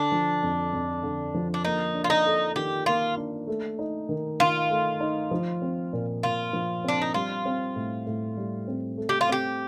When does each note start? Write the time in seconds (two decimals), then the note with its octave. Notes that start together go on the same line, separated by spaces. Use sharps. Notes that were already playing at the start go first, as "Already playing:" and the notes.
Already playing: D3 D4
0.12 F3
0.43 F2
0.73 F2
1.03 D3
1.34 F3
1.54 D4
1.65 A#3 D#4
1.95 D4
2.04 F4
2.10 D#4
2.26 A4
2.56 D#3 G4
2.86 A#3 F4
3.17 D4
3.47 A3
3.79 D#4
4.09 D#3
4.40 D#3 F4
4.70 A3
5.00 D#4
5.31 F3
5.62 C4
5.93 A#2
6.23 A#2 F4
6.53 F3
6.84 C4 D4
7.02 D#4
7.14 G3 F4
7.45 C4
7.76 A2
8.07 A2
8.37 G3
8.68 C4
8.97 A3
9.09 G4
9.21 F4
9.29 C4 G4